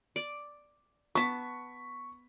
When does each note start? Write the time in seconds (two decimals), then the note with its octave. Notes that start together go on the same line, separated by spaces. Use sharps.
0.16 D5
1.15 B3 A5 C#6 B6